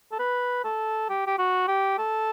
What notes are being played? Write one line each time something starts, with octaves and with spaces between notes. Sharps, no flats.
A4
B4
A4
G4
G4
F#4
G4
A4